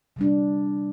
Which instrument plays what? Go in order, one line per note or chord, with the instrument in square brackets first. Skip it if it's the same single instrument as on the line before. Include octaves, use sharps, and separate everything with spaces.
[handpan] C3 G3 D4